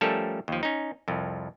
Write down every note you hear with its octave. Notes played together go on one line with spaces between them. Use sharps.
F3 G3 A3 C#4 A4 A#4
D#2 F3
C#4 D#4
C2 F2